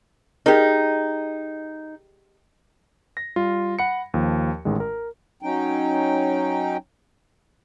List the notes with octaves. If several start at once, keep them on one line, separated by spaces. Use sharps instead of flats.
D#4 G4 G#4 A#4
A#6
G3 F4
F#5 B5 C#7
D#2 F3
A1 D#3 G#3
A#4
F#3 C#4 D#4 G5